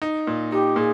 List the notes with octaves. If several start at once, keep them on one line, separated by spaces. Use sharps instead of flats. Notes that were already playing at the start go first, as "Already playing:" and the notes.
D#4
A#2
D#4 G4
A#2 G#4